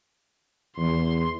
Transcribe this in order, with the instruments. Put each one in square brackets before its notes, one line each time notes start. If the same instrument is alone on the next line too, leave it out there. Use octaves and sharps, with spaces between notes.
[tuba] E2 [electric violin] C6